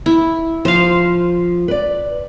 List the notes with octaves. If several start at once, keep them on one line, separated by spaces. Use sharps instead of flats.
E4
F3 C5 F5
B4 D5